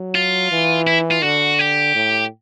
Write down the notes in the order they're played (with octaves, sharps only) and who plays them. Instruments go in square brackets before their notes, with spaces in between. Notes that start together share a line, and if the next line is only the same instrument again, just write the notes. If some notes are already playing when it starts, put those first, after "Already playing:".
Already playing: [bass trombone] F#3
[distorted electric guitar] F4
[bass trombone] E3
[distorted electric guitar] E4
F4
[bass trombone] D3 [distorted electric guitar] F#4
[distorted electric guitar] G4
[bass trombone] A2